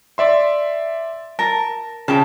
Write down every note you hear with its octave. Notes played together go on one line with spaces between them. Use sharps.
D5 E5 C6
A#4 A5
C#3 G4 A5